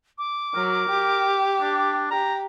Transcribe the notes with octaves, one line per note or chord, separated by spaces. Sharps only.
D6
F#3 A#4
G4
D4
G4 A#5